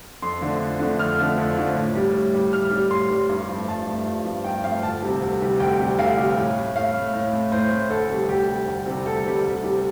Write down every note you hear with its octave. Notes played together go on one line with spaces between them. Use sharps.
F2 C6
D3 F3 A3
F2
D3 F3 A3
F2 F6
D3 F3 A3
F2
D3 F3 A3
A2
G3
A2
G3
A2 F6
G3
A2 C6
G3
G2
F3 A3
G2 A5
F3 A3
G2
F3 A3
G2 G5
F3 A3 F5
D2 A5
C3 G3
D2
C3 G3
D2 G5
C3 G3
D2 F5
C3 G3
A2
A3
A2 F5
A3
A2
A3
A2 C5
A3
D2 A4
C3 G3
D2 G4
C3 G3
D2
C3 G3
D2 A4
C3 G3
D2
C3 G3